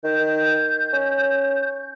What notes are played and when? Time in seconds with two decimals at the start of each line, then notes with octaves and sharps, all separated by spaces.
0.04 D#3 G6
0.93 C#4